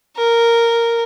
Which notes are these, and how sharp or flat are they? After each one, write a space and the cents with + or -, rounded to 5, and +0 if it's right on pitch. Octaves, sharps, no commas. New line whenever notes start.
A#4 -5